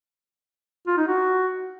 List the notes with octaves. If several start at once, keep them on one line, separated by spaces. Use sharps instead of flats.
F4
D#4
F#4